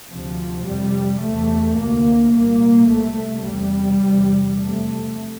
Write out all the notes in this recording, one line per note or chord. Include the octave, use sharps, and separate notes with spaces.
D2 C3 F3
F2 C3 G3
E2 C3 A3
D2 C3 A#3
C2 A#2 A#3
C2 C3 A3
E2 C3 G3
E2 C3
F2 C3 A3